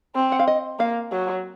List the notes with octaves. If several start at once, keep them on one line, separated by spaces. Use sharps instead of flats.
C4
F#5
F5
D#5
A#3 F5
F#3